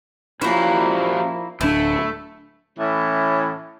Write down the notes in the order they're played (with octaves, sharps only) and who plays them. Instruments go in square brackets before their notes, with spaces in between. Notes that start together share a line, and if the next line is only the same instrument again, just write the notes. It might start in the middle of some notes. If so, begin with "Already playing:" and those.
[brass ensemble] A#2 F3 [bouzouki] A#3 E4 [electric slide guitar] C#4 F#4 G4
[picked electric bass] D1 D4 [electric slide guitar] A3 [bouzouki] E4
[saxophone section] A2 E3 C#4